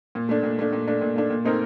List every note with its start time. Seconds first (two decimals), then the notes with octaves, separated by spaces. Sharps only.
0.15 A#2
0.29 A3 D4
0.43 A#2
0.59 A3 D4
0.73 A#2
0.88 A3 D4
1.01 A#2
1.16 A3 D4
1.30 A#2
1.45 A3 C4 D#4 A#4